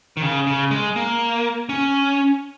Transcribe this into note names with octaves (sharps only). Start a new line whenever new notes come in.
D#3
C#3
C#3
G#3
A#3
C#4